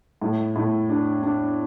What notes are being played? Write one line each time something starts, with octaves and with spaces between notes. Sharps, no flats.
A2
A2
D4
D4